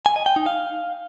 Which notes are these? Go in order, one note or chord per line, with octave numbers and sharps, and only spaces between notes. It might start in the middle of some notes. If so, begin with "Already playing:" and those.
G#5
D#5
G5
D#4
F5